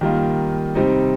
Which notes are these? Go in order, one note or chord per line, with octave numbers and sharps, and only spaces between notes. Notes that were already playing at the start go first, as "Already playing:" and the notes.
D#3 G3 A#3 F4
C3 G3 C4 D#4